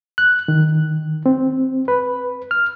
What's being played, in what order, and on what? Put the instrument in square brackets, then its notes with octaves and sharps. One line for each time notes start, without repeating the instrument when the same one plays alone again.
[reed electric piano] F#6
D#3
C4
B4
F6